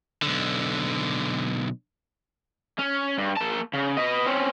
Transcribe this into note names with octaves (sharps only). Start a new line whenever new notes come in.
B1 D3
C#4
G2
A#3 A5
C#3
B4 D#5
C4 C#4